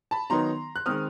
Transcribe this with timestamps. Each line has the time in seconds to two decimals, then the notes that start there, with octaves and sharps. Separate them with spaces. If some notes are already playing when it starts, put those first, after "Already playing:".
0.11 A5 B5
0.30 D#3 F#3 B3 D#4 A#5 C6
0.76 F#6
0.86 D#3 G#3 C4 D#6 F6